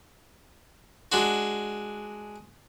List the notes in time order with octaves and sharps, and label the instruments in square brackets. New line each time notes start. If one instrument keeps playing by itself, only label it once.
[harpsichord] G#3 D4 F#4